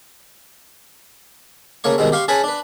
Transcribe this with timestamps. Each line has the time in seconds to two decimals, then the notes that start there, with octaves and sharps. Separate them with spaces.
1.84 C#3 A3 A#3 C#5 C#6
1.98 B2 D#3 G3 G#3 C4
2.12 G4 F5 C6 C#6
2.28 C#4 G#4 B4 G#5 A5 B5
2.44 D4 B4